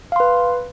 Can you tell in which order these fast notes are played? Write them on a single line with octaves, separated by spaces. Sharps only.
F5 C6 B4